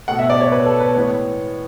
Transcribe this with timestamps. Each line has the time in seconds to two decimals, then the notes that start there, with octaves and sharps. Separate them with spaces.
0.08 B2 A3 F#5
0.19 E5
0.30 D5
0.41 C#5
0.52 B4
0.66 A4
0.80 B4
0.95 A2 E3 G#3 B3 C#5